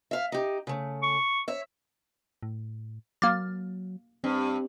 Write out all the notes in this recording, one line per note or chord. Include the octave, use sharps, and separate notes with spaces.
E5 F5
D#4 G4
C#3 A3
C#6
C#5 E5
A2
F#3 A#3 D6 F6 A6
G2 C4